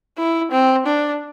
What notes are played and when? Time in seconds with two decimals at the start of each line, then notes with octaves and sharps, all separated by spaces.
0.18 E4
0.52 C4
0.86 D4